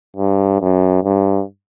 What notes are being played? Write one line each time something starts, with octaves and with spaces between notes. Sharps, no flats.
G2
F#2
G2